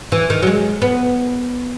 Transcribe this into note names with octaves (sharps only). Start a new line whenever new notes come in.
E3
D#3
F#3
G#3
B3